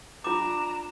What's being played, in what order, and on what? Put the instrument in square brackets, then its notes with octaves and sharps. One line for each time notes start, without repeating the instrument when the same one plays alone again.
[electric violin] D4 [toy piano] F4 D6 [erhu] A#5 [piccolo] E7